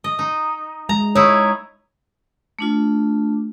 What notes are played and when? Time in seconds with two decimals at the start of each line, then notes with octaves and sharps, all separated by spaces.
0.04 D#5
0.19 D#4
0.89 G#3 A#5
1.15 D#4 E4 C#5
2.59 A3 D4 F4